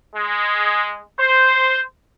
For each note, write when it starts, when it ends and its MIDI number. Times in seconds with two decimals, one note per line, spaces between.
0.14 1.01 56
1.18 1.81 72